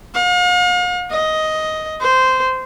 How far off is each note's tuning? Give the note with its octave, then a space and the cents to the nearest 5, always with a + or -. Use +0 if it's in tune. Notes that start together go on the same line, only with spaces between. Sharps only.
F5 +45
D#5 +10
C5 -15